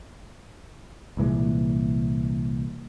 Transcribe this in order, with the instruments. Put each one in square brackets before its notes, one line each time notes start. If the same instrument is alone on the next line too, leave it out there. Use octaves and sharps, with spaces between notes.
[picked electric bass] C2 A#2 E3 G#3